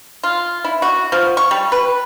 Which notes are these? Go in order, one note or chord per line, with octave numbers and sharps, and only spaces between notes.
F4
E4
F#4
F3
C#6
G3
B4